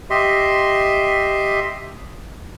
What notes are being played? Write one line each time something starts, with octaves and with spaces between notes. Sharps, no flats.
G4 D#5 E5 C6